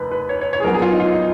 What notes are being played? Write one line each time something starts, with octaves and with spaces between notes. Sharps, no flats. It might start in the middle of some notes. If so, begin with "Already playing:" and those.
Already playing: F1 D#2 B4
B4
C#5
C#5
C#5
G#4
A#1 A#2 F#3 B3 A#4
G#4
F4
D#4
F4
D#4